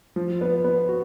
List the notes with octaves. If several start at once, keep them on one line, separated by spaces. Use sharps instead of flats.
F3
B3
B3
F#4